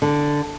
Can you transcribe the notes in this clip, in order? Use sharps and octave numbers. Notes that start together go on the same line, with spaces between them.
D3